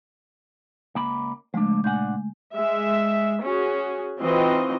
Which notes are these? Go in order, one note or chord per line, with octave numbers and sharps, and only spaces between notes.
C#2 A#3 B5
C#3 F3 G#3 A3 D4
A#2 D4 F#5 G#5 G6
G#3 E5
C#4 F#4 G#4
E3 C4 D#4 F4 F#4 D#5